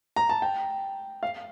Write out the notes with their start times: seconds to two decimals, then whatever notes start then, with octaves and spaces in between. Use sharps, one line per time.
0.16 A#5
0.29 A5
0.42 G5
1.23 F5